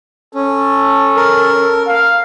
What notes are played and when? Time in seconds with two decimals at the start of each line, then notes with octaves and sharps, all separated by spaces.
0.35 C#4 A4
1.16 A#4
1.87 F5